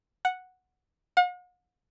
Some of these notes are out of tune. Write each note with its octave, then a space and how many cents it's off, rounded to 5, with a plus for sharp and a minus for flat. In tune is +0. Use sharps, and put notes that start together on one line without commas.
F#5 -5
F#5 -45